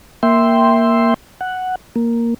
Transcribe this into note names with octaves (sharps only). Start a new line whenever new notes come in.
A#3 E5 G5 C6
F#5
A#3